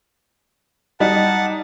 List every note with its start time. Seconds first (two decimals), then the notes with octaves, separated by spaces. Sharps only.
1.00 G3 D#4 F#5 A5